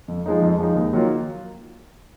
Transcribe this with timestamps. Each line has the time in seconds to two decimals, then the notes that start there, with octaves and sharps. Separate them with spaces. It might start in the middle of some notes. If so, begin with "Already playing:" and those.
0.08 F2
0.26 F3 G#3 D#4
0.42 F2
0.59 F3 G#3 D#4
0.75 D#2
0.93 D#3 F#3 A#3 F4